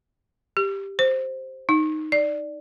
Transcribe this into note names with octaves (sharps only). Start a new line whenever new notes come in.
G4
C5
D#4
D5